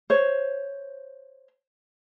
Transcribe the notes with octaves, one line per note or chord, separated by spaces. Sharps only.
C5 C#5